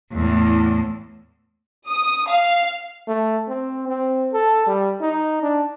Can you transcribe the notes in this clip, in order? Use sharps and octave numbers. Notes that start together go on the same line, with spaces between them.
E2 A2
D#6
F5
A3
C4
C4
A4
G3
D#4
D4